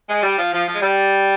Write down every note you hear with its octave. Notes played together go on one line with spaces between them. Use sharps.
G#3
G3
F3
F3
F3
G#3
G3